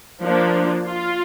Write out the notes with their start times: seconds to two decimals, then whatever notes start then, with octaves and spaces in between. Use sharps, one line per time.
0.24 F3 A#3 D4
0.86 F4